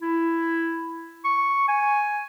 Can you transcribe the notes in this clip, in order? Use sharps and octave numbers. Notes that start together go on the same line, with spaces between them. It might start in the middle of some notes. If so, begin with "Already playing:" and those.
E4
C#6
G#5